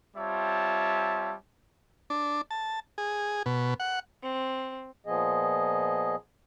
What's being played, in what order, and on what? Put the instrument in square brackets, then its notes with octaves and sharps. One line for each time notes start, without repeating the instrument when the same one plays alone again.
[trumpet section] G3 C4 F4 C#5 E5 A5
[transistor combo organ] D4
A5
G#4
B2
F#5
[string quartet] C4
[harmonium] A#2 F3 B3 G#4 D#5